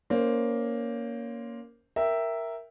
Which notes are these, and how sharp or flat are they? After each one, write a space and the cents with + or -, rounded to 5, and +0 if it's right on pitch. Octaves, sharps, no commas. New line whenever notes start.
A#3 +5 C#4 +20 C5 +0
A#4 +0 E5 +0 G5 -5